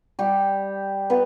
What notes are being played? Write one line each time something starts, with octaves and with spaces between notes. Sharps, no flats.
G3 G4
B3 B4